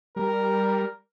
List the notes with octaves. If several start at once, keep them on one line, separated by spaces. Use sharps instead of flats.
G3 A#4